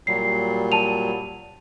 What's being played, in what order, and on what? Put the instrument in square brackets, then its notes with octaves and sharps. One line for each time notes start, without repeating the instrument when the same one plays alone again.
[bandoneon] A#2 F#3 G3 [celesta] C7
[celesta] A5 D#7 F7